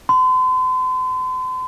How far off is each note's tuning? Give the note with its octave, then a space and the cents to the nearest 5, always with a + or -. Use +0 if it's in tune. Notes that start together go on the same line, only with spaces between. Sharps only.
C6 -45